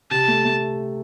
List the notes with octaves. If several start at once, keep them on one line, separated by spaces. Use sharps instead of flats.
C3 A5
A3
A3